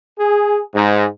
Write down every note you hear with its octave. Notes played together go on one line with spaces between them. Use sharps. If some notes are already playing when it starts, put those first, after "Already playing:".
G#4
G#2